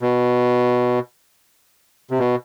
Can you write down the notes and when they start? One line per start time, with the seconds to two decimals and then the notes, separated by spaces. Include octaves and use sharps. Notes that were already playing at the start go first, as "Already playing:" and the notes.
0.02 B2
2.11 C3
2.19 B2